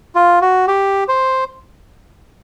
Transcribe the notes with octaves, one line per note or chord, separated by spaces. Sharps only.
F4
F#4
G4
C5